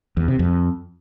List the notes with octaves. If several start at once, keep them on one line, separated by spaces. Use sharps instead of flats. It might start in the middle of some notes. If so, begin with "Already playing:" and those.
E2
C3
F2